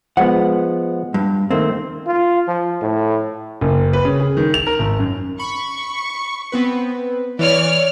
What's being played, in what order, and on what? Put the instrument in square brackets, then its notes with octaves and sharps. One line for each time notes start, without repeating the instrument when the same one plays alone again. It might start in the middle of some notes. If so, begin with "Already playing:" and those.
[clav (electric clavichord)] F3 G#3 B3 [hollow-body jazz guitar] F#5
[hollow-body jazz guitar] G2
[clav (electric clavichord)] D#3 A3 A#3 [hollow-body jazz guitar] C4
[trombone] F4
F3
A2
[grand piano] F#1
B4
C#3
G#4
D#3
F7
A#4
G#1
F#2
[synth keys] B5 [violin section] C#6
[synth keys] B3 C4 B4
[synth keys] E3 [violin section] C#5 D5 F6